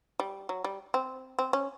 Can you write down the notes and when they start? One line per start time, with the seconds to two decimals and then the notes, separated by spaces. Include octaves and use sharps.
0.20 G3
0.49 F#3
0.64 G3
0.94 C4
1.39 C4
1.53 C#4